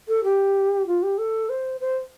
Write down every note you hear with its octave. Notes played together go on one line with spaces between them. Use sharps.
A4
G4
F4
G4
A4
C5
C5